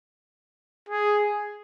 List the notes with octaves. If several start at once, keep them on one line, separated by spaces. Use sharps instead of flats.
G#4